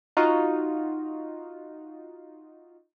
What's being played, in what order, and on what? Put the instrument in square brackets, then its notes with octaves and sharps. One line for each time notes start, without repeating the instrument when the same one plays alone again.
[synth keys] D#4 F4 F#4